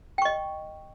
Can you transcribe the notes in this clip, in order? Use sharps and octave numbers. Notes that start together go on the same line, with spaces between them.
D#5 G5 C#6